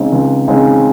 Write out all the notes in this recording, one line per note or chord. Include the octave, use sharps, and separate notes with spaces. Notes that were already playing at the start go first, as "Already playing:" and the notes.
Already playing: C#2 C#3 G#3 C4 D#4
C#2
C#3 G#3 C4 D#4